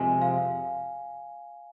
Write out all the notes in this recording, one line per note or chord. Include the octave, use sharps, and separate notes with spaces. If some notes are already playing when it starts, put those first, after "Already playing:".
Already playing: F2 C3 G#3 G#5
F5